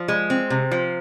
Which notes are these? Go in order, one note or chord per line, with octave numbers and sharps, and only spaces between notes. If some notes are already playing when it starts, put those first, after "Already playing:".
Already playing: F3
G#3
C4
C3
F3